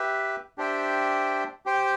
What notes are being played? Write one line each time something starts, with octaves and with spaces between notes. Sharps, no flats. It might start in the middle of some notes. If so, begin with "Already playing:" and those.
Already playing: G4 B4 E5
D4 G4 C5 E5 G5
G4 C5 G5